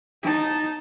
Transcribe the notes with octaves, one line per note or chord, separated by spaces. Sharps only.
D#4 A5